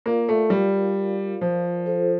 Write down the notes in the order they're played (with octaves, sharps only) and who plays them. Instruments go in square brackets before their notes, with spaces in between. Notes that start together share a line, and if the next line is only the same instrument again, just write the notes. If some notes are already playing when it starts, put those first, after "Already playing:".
[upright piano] A#3 [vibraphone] F4 A#4 D5 F5
[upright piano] A3
G3
F3
[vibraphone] F4 A4 C5